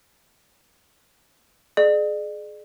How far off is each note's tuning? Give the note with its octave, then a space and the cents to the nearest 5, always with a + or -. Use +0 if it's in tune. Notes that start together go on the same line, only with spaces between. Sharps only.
G#4 +30 D5 +40